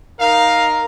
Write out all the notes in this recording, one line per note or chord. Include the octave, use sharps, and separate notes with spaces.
D#4 A#4 F5